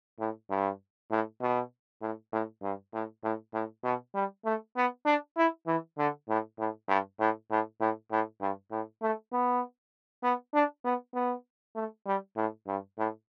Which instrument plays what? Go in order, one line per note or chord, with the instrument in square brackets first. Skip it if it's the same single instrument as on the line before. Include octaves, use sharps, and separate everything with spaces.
[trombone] A2
G2
A2
B2
A2
A2
G2
A2
A2
A2
B2
G3
A3
B3
D4
E4
E3
D3
A2
A2
G2
A2
A2
A2
A2
G2
A2
A3
B3
B3
D4
B3
B3
A3
G3
A2
G2
A2